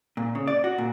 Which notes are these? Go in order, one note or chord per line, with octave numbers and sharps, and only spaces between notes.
A#2
C#3
D5
F#4
A#2